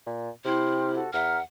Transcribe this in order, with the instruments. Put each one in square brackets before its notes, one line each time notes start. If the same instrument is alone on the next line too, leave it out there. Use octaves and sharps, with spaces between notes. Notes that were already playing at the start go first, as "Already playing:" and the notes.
[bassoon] A#2
[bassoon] C3 [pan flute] E4 [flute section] G5 C6 F6
[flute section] F#4 A4
[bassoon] E2 [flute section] E5 A#5 F6 [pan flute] F#5